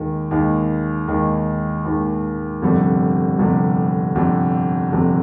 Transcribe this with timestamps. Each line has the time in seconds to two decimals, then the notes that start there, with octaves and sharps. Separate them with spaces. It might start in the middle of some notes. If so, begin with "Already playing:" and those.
Already playing: D#2 D#3 G#3
0.31 D#2 D#3 G#3
1.08 D#2 D#3 G#3
1.85 D#2 D#3 G#3
2.62 G1 F2 C3 G3
3.38 G1 F2 C3 G3
4.15 G1 F2 C3 G3
4.92 G1 F2 C3 G3